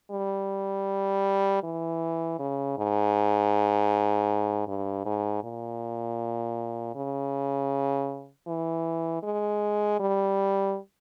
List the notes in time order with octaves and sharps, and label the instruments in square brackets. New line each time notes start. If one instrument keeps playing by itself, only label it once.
[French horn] G3
E3
C#3
G#2
G2
G#2
A#2
C#3
E3
G#3
G3